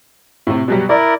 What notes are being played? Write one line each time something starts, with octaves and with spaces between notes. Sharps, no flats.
A2 C3
B2 F#3 G3
E4 A#4 D5